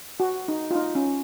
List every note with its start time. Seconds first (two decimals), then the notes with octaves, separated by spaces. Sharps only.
0.20 F#4
0.48 D#4
0.71 F4
0.75 D#4
0.95 C#4